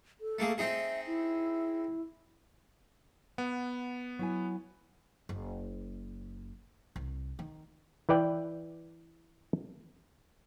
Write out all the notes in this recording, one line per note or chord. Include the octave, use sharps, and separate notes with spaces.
A4
A3 A#3 G#4
C4 D#4 G#4 E5
E4
B3 F#5
F#3 E4 G#5
F#1
C2
D#3
E3 B4 D5 G5